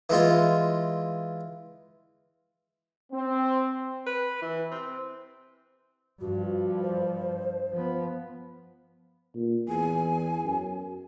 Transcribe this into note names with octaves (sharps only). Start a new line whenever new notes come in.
E3 G#3 F4
C4
B4
E3
C4
G2 F3 F#4
C5
F3 B3
A#2
E2 G#5
F#2